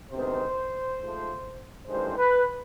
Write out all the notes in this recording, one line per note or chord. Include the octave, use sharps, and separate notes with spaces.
D2 C3 D#3 G#3 B3 C5
G#2 F3 A3
A1 G2 D#3 G#3 C5
B4